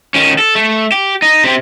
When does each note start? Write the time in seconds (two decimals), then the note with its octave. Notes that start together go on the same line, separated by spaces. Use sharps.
0.15 D#3 C#4
0.39 A4
0.55 A3
0.92 G4
1.22 D#4
1.44 C3 C4